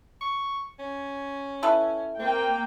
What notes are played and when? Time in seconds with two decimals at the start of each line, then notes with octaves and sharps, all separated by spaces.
0.21 C#6
0.79 C#4
1.63 E4 A4 B4
2.19 A#3 C4 G5